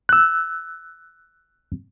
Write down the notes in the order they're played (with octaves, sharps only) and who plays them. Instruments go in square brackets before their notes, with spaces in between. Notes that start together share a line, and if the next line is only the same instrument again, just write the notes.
[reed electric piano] E6 F#6